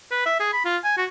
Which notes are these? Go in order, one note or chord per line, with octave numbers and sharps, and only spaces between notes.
B4
E5
G#4
B5
F4
G#5
F#4